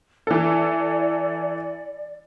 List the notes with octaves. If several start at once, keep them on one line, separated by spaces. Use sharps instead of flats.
E3 A4 D5